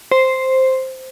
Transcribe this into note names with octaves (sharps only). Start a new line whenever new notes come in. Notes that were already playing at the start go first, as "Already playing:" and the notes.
C5